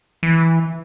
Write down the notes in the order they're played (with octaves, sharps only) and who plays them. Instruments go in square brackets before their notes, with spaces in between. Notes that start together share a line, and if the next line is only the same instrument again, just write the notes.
[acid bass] E3